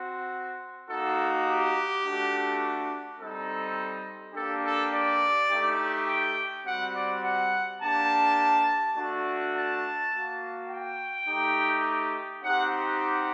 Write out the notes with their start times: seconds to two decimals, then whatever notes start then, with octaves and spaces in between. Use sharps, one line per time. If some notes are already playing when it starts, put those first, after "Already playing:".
Already playing: C4 F#4
0.89 A#3 D#4 F#4 A4
1.46 G4
2.04 A3 D4 F#4
3.19 G3 C4 D#4 A4
4.35 A#3 D4 G4 A4
4.64 A4
4.93 D5
5.50 A3 D#4 G4
6.08 G5
6.65 G3 C4 F#4 F#5
6.95 D5
7.23 F#5
7.81 A#3 D4 G4 A5
8.96 A3 D4 F#4
9.54 A5
10.12 A#3 F#4
10.69 G5
11.28 A3 D#4 G4
12.43 C4 D#4 G4 F#5
13.00 F#5